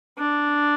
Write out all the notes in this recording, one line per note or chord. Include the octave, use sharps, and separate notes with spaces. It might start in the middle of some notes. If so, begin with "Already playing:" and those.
D4